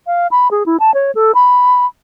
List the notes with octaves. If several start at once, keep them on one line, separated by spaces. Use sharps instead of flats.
F5
B5
G#4
E4
A5
C#5
A4
B5